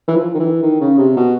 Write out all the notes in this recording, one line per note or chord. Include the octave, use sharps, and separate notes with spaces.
E3
F3
D#3
E3
D#3
C#3
C3
B2